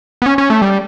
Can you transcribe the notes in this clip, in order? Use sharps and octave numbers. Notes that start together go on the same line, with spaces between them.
B3
C#4
C#4
A3
G3